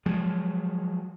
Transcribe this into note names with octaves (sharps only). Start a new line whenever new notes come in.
F3 F#3 G#3